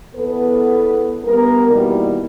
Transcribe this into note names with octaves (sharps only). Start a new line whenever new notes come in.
E2 B3 A4 B4
G2 B3 A#4
B2 D#3 E3 G3 A#3